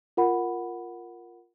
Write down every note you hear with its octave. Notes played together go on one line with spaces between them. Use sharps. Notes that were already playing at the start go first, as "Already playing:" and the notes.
F4 A#4 F#5 B5